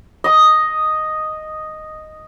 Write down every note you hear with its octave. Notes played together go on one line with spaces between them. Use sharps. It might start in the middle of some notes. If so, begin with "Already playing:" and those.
D#5 D#6